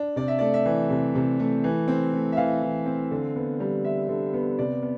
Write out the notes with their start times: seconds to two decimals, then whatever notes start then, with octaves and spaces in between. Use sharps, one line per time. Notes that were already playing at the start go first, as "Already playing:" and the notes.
Already playing: D4
0.16 C3 D5
0.28 E5
0.39 A3 D5
0.54 E5
0.65 E3
0.90 C3
1.15 C3
1.40 A3
1.64 E3
1.88 C4
2.13 A3
2.32 E5
2.37 E3 F5
2.62 E3
2.86 C4
3.11 D3
3.36 B3
3.60 G3
3.84 D3 E5
4.09 D3
4.34 B3
4.59 C3 D5
4.82 B3